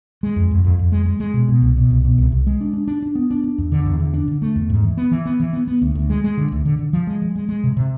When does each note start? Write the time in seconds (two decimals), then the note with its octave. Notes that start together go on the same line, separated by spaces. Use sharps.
0.23 G#3
0.36 F2
0.51 F2
0.64 F2
0.79 F2
0.92 G#3
1.06 G#3
1.20 G#3
1.34 B2
1.48 B2
1.62 C2
1.77 B2
1.90 C2
2.04 B2
2.18 C2
2.32 C2
2.47 G#3
2.61 D4
2.73 D4
2.87 D4
3.02 D4
3.15 B3
3.31 D4
3.44 D4
3.58 E2
3.72 D3
3.86 E2
4.00 D3
4.14 D4
4.28 D3
4.42 A3
4.56 E2
4.70 G#2
4.84 E3
4.97 B3
5.11 E3
5.26 B3
5.40 E3
5.53 B3
5.67 B3
5.82 D2
5.95 D2
6.10 G#3
6.24 G#3
6.37 D3
6.52 D2
6.65 D3
6.79 D3
6.93 F3
7.07 G#3
7.22 F3
7.36 G#3
7.49 G#3
7.64 C3
7.77 C3